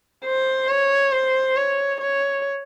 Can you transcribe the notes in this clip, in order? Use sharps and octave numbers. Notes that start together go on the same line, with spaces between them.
C5
C#5
C5
C#5
C#5